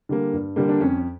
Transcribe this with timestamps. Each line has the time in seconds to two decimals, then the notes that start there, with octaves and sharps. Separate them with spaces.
0.09 D3 G3 A#3
0.33 G2
0.56 D3 G3 A#3
0.69 D4
0.80 F2 C#4